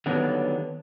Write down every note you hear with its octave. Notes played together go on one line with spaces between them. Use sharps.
D3 D#3 F#3 G3 B3 D4